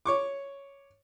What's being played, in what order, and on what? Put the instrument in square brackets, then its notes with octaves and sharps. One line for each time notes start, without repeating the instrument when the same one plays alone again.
[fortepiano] C#5 C#6 D6